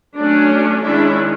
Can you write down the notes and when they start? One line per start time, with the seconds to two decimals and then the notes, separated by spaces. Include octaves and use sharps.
0.16 F#3 A3 C#4 D4
0.83 D#3 G#3 C#4 D4 E4